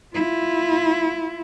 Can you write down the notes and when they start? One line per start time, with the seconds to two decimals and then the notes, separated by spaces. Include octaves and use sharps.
0.14 E4 F4